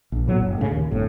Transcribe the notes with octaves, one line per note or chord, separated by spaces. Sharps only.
A#1
A2 F#3 B3
F#1
A2 C#3
D#2
D1 G1 A2